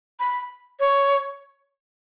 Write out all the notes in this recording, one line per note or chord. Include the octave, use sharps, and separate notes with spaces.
B5
C#5